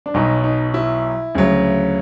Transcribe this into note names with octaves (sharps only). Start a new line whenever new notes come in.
D4
B1 B2 F#3 D#4
D#4
E4
D2 C#3 F#3